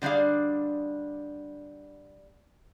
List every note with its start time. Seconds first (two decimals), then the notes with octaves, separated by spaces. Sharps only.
0.02 D3 G3 D4 G#4 F5